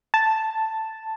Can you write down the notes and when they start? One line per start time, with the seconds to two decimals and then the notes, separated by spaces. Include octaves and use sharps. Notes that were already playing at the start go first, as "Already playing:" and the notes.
0.14 A5